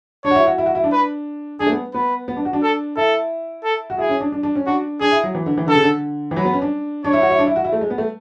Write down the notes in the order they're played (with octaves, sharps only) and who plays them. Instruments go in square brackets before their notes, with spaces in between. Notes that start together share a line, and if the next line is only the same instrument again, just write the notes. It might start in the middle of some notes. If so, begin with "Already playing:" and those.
[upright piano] D4 [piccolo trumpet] C#5
[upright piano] F#4
E4
F#4
E4
F#4
E4
D4
[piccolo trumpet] B4
[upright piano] D4 [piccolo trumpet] G#4
[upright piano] A3
B3
[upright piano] B3 [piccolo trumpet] B4
[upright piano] B3
D4
F#4
D4
[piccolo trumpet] A4
[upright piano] E4 [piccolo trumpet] A4
[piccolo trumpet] A4
[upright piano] F#4
[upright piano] E4 [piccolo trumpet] G#4
[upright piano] C#4
D4
D4
D4
C#4
[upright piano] D4 [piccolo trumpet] F#4
[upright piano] D4 [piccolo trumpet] G#4
[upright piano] E4
F#3
E3
D3
E3
[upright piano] D3 [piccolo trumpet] A4
[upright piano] C#3
D3
E3
[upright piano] F#3 [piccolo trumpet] B4
[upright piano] B3
C#4
D4
[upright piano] D4 [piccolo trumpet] C#5
[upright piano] E4
F#4
E4
D4
E4
F#4
E4
A3
G#3
B3
A3